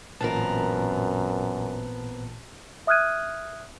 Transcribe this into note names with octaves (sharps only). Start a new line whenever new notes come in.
A1 F#2 A#2 B3 C4 A#4 A5
E5 D#6 F6 F#6 G#6 D#7